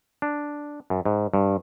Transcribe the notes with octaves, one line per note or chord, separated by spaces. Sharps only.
D4
F#2
G#2
G2